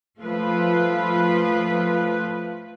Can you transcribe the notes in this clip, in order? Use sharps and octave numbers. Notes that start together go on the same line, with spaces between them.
F3 A3 F4 B4